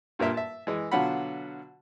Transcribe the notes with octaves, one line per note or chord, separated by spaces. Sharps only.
G2 A#2 A#4 E5 C6
E5 A5
E3 G#3
B2 D3 F#3 F4 F#5 B5